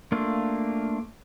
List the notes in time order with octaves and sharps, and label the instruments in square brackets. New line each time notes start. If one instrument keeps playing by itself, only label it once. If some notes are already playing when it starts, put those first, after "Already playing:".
[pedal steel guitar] A3 A#3 D4 F4